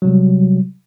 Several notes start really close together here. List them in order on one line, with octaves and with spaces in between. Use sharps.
F#3 C3 G3